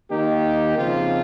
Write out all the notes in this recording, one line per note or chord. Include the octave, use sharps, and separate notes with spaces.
D#3 A#3 D#4 G4
C#3 F3 C4 F4